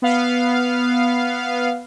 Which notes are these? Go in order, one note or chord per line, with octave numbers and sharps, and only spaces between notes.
B3 F5